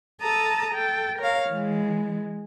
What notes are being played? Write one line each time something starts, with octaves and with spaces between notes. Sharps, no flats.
A4 A5 A#5 D#6
A4 G5
A#4 C#5 F5
E3 G#3